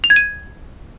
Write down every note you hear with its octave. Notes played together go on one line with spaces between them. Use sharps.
F7
G#6
D#7